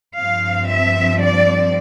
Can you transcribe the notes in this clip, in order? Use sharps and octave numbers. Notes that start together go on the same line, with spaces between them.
G2 F3 C4 F5
E5
D5